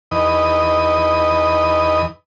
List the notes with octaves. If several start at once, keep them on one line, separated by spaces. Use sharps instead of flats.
E2 D#4 B4 D#5